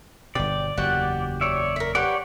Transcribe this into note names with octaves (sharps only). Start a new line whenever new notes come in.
G1 B2 D5 G5
F#1 E2 F#4 G4 F#5
C#5 D5 E5
A#4 E5
G4 B4 C#5 D5 F#5